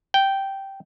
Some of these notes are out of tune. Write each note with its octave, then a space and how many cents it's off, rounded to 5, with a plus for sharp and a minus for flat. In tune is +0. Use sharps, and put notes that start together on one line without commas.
G5 -10